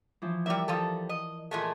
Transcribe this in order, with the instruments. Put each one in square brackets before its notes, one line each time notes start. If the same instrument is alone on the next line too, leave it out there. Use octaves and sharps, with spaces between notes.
[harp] E3 F3
[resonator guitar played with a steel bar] G3 E5 [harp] E4 A#4 D5
[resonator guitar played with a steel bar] F3 G3 A4
D#5
A#2 G#3 A3